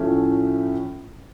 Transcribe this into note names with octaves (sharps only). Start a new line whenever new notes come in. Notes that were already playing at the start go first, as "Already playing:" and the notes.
Already playing: A2 F3 A3 C#4